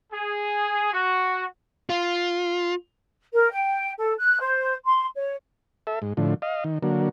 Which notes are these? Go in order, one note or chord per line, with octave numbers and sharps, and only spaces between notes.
G#4
F#4
F4
A#4
G5
A4
F#6
C5
C6
C#5
A4 E5
G#2
A2 D3 F3
D#5 F5
D#3
D3 F#3 A#3